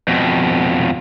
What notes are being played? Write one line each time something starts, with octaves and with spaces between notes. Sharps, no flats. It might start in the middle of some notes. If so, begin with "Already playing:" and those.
F2 B2